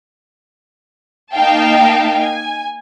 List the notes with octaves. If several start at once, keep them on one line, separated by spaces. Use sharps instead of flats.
A#3 D#4 F5 G5 A5
G#5